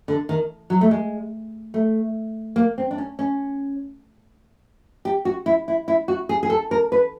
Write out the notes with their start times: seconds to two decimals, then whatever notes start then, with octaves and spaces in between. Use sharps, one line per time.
0.08 D3
0.29 D#3
0.70 F#3
0.81 A3
0.91 G#3
1.74 A3
2.56 A#3
2.78 C4
2.91 D4
2.98 C#4
3.19 C#4
5.05 G4
5.25 F#4
5.46 E4
5.68 E4
5.88 E4
6.08 F#4
6.29 G#4
6.43 G#4
6.50 A4
6.71 A#4
6.92 B4